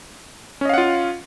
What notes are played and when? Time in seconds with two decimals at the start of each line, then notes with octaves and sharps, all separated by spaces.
0.61 C#4
0.65 D#5
0.69 F5
0.74 F#5
0.78 F4